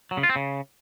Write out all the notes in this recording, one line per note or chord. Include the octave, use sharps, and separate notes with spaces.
F#3
C#3
F4
C4
C#3